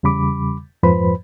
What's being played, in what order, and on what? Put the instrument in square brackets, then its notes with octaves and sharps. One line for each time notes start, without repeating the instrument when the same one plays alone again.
[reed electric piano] E2 C#3 G3 B5 D6
F2 G#2 F3 B4 C5 B5